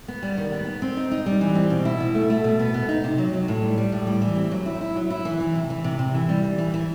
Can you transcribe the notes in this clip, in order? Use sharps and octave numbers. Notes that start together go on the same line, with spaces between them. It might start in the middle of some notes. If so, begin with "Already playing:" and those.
B3
G3
D#3
B3
B3
C4
D#4
D#4
G3
E3
C4
B2
E4
B2
A3
A3
B2
B3
B3
D#4
C3
F#3
F#3
A2
G3
G3
A2
G3
E3
C4
F#3
E4
E4
F#3
E4
E3
E3
C3
E3
C3
C3
E3
G3
E3
E3
E3